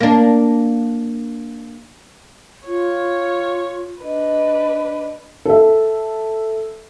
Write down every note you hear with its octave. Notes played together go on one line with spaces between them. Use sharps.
A#3 D4
F4 C#5
D4 B4 D#5
A4 E5